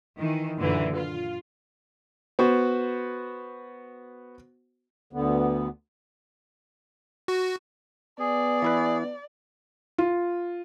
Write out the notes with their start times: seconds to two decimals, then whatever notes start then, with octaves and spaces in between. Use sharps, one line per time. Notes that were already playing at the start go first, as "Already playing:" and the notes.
0.17 D#3 E3
0.57 F#2 A#2 D3 E3
0.94 F4
2.39 B3 F#4 C5
5.13 D2 D3 B3
7.28 F#4
8.20 B3 G#4 D5
8.62 E3 E4 B4
9.98 F4